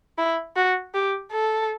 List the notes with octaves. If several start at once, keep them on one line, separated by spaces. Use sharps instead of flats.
E4
F#4
G4
A4